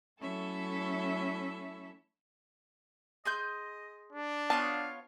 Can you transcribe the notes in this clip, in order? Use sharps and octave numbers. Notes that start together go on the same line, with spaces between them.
F#3 A3 C#4 E4 A4 E5
G#4 D#5 C6 G6
D4
B3 F4 C#5 F5 A5